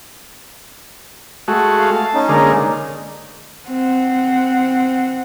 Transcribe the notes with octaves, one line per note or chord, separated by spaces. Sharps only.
G#3 A3 F#4
F5
A5
C#4 D#4
D3 G#3 A#3
C4 F#5